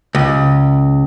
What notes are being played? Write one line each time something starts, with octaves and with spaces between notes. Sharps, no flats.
C#2